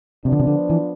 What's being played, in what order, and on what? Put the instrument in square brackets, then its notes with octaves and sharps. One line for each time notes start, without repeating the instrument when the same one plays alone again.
[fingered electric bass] C3 [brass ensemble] F3 B3 D4
[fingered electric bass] D3
C3
D3
E3